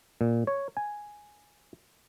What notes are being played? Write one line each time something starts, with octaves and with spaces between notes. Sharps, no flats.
A#2
C#5
G#5